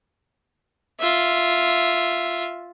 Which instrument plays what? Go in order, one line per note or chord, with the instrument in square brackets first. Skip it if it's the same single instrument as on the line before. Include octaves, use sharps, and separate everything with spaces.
[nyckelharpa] F4 E5